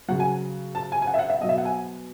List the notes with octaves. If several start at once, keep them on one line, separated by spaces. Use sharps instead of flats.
C#3 F#3 F#5
G#5
A5
G#5
G#5
F#5
E5
F#5
E5
B2 F#3 D#5
E5
F#5
G#5